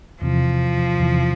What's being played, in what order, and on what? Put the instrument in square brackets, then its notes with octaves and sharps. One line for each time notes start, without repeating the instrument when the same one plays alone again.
[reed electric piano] E2 C3 E3 [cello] F3
[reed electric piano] E2 C3 E3